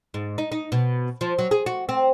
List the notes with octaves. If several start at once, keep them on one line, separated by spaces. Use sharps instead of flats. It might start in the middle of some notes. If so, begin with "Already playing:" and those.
G#2
D#4
D#4
B2
F3
F#3
G#4
F#4
C4